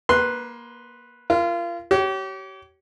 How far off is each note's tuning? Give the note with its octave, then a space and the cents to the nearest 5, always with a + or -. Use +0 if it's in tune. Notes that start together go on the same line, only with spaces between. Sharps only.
A#3 +20 B4 +0 C6 +0
F4 -30 A#4 +0
G4 -35 C#5 +0